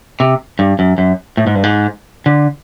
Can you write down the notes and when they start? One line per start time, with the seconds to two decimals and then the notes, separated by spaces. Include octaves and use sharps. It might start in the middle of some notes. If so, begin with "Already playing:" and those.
0.20 C3
0.59 G2
0.79 F#2
0.98 F#2
1.37 A2
1.47 G#2
1.55 G2
1.63 G#2
2.26 D3